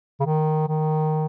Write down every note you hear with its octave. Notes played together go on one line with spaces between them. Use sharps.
C#3
D#3
D#3